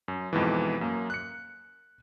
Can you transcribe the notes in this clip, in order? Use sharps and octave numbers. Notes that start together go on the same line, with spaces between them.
F#2
F2 G#2 B2 E3
F#2 A#3
F#6 C#7